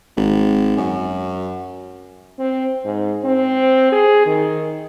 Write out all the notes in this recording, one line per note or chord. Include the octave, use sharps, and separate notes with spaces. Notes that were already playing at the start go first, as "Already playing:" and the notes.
G#1
F#2
C4
G#2
C4
G#4
D#3